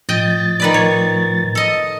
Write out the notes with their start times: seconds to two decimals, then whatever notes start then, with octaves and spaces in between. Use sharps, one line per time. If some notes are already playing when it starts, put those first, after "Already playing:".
0.09 A2 F3 D#5 G5 A6
0.60 D#3 B4 D5
0.74 C#5
1.55 A4 D#5